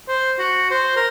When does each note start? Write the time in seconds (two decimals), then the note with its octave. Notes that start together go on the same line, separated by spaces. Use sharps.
0.08 C5
0.39 F#4
0.71 C5
0.96 A#4